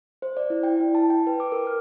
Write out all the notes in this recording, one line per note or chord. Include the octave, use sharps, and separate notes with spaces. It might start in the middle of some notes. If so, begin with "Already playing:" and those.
C5
D5
E4
G5
E4
A5
G5
B4
D6
A#4
F6